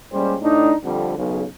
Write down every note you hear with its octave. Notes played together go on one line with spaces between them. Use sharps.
A#2 G3 G#3 C#4 G4 C5
A2 D4 D#4
F2 D3 G3
B1 C#3